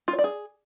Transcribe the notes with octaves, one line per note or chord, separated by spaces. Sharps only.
F4
C#5
D5
G#4